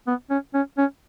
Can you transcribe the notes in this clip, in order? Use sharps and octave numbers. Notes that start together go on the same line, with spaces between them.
B3
C#4
C#4
C#4